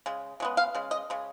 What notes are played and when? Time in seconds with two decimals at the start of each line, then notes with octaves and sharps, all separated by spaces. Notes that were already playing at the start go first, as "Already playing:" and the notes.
0.06 C#3 G#3
0.40 C#3 G#3 B3
0.57 F5
0.75 C#3 G#3
0.91 D#5
1.10 C#3 G#3